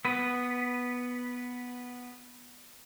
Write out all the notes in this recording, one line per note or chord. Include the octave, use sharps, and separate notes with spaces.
B3 B4